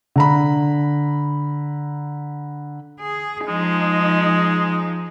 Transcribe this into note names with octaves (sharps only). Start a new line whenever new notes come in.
D3 A#5 B5
G#4
F3 G#3 D#4